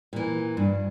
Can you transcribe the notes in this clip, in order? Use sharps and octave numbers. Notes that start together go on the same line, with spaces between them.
A#2 E3
G2